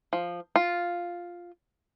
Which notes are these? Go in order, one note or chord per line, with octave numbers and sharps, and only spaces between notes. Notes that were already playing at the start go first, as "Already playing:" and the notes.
F3
F4